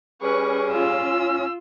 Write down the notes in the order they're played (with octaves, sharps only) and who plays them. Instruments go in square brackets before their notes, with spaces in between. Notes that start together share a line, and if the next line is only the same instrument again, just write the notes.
[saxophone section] G3 G#4 [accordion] C#4 [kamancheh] B4 C#6
[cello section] F4 [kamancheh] E6